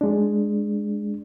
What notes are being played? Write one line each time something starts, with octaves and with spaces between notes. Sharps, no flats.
G#3 D4